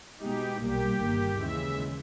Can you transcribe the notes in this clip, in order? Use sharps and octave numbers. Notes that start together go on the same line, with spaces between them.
B2 G#3 D#4 G4
B1 A#2 G3 A#3 G4
G1 G2 D#3 A#3
D#2 C#3 E3 G#3 E5